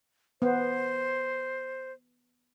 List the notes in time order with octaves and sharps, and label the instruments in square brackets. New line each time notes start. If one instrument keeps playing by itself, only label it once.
[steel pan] B3 [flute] C5